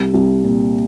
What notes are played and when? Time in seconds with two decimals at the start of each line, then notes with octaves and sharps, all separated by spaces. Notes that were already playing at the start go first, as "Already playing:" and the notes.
Already playing: C2
0.14 C2
0.44 A#2